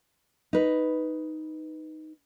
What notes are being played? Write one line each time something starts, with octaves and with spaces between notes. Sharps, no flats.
D#4 B4